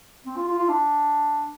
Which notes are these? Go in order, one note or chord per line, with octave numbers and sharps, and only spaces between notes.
C4
F4
F4
F4
D4